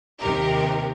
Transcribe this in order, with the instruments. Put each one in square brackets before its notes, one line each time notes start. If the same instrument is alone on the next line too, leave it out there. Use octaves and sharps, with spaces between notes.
[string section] D#2 C3 D#3 G4 A#4